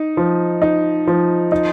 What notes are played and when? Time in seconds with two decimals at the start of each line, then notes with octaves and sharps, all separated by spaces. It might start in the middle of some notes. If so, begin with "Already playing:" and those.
Already playing: D#4
0.17 F3
0.62 D#4
1.07 F3
1.52 D#4